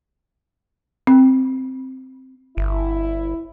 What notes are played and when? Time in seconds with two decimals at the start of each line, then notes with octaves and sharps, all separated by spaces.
1.07 C4
2.57 G1 E4